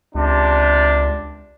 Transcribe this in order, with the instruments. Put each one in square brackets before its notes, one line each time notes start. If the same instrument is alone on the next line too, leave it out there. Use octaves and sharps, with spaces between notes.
[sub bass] C#2 [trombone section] C3 D4